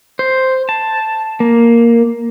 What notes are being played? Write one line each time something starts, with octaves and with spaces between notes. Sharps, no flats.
C5
A5
A#3